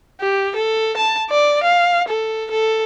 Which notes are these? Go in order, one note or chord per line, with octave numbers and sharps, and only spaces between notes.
G4
A4
A5
D5
F5
A4
A4